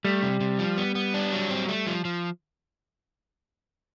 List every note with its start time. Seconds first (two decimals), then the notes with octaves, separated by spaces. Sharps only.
0.05 G3 A3
0.22 C3
0.40 C3
0.59 F3
0.77 B3
0.95 B3
1.14 D4
1.32 F#3
1.50 C4
1.68 A3
1.87 F3
2.05 F3